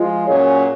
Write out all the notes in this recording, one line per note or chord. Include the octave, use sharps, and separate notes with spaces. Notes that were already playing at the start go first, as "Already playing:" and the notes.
Already playing: F3 G#3 F4
A#2 F#3 C#4 G#4 C#5